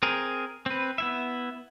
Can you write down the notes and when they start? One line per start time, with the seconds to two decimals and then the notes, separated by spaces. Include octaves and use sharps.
0.03 C4 G#4 A#4
0.66 C4 B4
0.98 B3 E4 E5